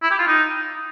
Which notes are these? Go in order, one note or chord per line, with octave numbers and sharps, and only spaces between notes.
E4
G4
F4
D#4